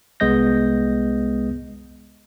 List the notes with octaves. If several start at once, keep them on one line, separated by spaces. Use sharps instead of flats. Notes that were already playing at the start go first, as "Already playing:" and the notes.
C2 G#3 B3 D#5 G6 A#6